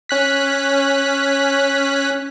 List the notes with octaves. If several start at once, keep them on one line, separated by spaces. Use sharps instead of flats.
C#4 F#6 B6